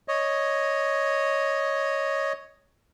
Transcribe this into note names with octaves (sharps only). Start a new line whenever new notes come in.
C#5 D#5